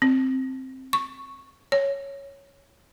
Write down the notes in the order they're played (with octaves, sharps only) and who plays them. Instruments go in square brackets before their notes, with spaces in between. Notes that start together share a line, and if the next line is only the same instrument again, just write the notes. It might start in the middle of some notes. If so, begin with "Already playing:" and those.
[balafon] C4
C#6
C#5